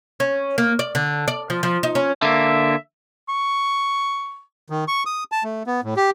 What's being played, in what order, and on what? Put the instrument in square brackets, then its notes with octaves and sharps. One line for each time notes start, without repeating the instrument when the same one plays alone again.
[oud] C#4
A#3
D5
D3
D5
F3
F3
D#4
C#4
[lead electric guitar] D3 A#3 [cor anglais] E5
[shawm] C#6
[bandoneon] D#3
C#6
D#6
A5
A3
B3
A2
G4